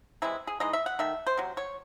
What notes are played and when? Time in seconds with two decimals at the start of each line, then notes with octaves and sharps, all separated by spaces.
0.22 C3 E3 G#3 E4
0.47 G#4
0.60 E3 G#3 D#4 D#5
0.73 E5
0.86 F#5
0.99 D#3 A3 E5
1.27 C5
1.37 C3 F#3
1.57 C#5